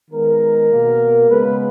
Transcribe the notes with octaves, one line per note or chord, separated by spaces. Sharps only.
D#3 G#3 B3 A#4
B2 A#3
C#3 G#3 B3 B4